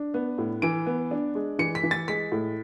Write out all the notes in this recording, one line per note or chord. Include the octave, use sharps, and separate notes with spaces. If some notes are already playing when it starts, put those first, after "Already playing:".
Already playing: D4
B3
A2
E3 D7
B3
D4
G#3
E3 C#7
B6
E3
A6
G#3 B6
A2